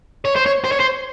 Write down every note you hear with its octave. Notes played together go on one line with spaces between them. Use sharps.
C#5
C5
C#5
C5
C#5
C5